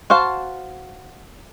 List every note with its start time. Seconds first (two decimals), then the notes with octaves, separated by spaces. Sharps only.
0.10 F#4 C5 F5 A5